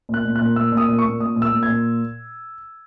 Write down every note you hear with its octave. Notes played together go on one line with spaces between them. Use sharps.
A#2 F#6
A#2
F#6
A#2
A#2 E6
A#2
D#6
A#2
C#6
A#2
A#2 D#6
A#2
E6
A#2
A#2 G#6